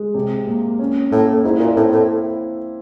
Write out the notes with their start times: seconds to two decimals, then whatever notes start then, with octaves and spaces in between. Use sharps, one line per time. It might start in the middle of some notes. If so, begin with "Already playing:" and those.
Already playing: G#3
0.15 C3
0.47 A#3
0.79 C#4
1.11 A2 A#3
1.44 G#2 E4
1.60 A#2
1.76 A2 C4
1.92 A2